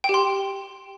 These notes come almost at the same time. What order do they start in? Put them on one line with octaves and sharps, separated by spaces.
G5 G4 C6